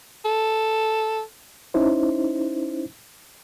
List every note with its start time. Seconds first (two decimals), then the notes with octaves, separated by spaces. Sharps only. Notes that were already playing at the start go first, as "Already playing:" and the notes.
0.25 A4
1.74 C#4 D#4 E4 C5